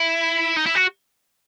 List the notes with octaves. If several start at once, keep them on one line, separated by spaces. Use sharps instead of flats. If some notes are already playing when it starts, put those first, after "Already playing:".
Already playing: E4
D#4
E4
F#4